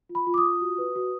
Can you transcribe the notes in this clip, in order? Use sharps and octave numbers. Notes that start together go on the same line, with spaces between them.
F4
B5
F4
D6
D#6
F4
F#4
B4
F#4